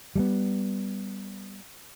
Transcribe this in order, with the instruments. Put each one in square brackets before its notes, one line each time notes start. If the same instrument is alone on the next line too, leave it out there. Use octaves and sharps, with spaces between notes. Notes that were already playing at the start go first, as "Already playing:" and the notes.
[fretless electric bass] G3 G#3 B3